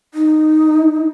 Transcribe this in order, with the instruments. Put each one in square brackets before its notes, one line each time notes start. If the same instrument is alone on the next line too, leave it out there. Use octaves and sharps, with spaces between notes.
[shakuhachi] D#4